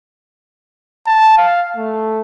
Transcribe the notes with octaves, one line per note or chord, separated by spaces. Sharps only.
A5
F5
A3